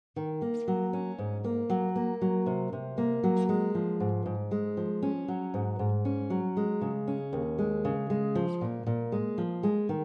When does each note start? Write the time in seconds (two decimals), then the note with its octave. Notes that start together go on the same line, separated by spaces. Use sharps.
0.16 D#3
0.42 A#3
0.68 F#3
0.93 C#4
1.18 G#2
1.44 A#3
1.70 F#3
1.96 A#3
2.22 F#3
2.46 C3
2.73 C3
2.98 A#3
3.24 F#3
3.49 G#3
3.75 F3
4.00 G#2
4.26 G#2
4.51 G#3
4.77 F3
5.02 C#4
5.28 F#3
5.54 G#2
5.79 G#2
6.05 C#4
6.30 F#3
6.57 G#3
6.82 C#3
7.08 C#4
7.33 D#2
7.58 G#3
7.85 C#3
8.10 G#3
8.35 F3
8.61 A#2
8.86 A#2
9.12 G#3
9.38 F3
9.63 G#3
9.89 D#3